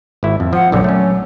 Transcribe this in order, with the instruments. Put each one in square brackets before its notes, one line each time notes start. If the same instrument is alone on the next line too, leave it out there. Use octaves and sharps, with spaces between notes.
[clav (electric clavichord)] G#1 E4
F2
[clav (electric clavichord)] F3 [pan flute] F#5
[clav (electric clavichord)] A#1 D3 C4 [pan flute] F#3
[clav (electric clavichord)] A3 C#4